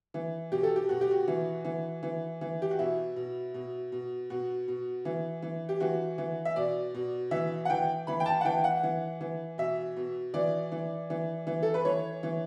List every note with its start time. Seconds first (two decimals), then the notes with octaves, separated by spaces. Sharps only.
0.14 E3
0.52 B2 G4
0.63 A4
0.76 G4
0.89 B2 F#4
1.01 G4
1.11 F#4
1.28 E3
1.65 E3
2.03 E3
2.41 E3
2.62 G4
2.71 F#4
2.79 B2 E4
3.16 B2
3.54 B2
3.92 B2
4.30 B2 F#4
4.68 B2
5.05 E3
5.42 E3
5.69 G4
5.80 E3 F#4
6.18 E3
6.45 E5
6.56 B2 D5
6.94 B2
7.31 E3 E5
7.65 F#5
7.70 E3 G5
8.07 E3 B5
8.20 G5
8.26 A5
8.41 F#5
8.45 E3 G5
8.64 F#5
8.83 E3
9.21 E3
9.58 B2 E5
9.96 B2
10.34 E3 D5
10.72 E3
11.10 E3
11.47 E3
11.62 A4
11.74 B4
11.85 E3 C#5
12.23 E3